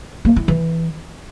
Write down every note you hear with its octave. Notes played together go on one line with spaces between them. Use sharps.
A#3
E4
E3